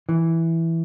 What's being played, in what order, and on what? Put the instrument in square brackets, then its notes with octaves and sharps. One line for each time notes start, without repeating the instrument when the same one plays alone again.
[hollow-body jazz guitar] E3